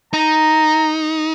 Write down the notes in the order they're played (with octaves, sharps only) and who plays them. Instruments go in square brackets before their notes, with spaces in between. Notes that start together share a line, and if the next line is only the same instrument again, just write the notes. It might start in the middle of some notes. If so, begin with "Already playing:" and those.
[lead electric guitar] D#4 [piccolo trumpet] A#5